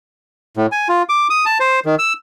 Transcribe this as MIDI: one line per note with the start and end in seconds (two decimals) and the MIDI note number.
0.57 0.66 45
0.72 0.88 80
0.89 1.02 65
1.09 1.28 86
1.30 1.45 87
1.45 1.58 81
1.60 1.80 72
1.85 1.95 51
1.99 2.13 88